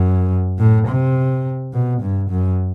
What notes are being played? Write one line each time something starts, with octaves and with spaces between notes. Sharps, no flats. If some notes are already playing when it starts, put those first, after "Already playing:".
Already playing: F#2
A2
C3
B2
G2
F#2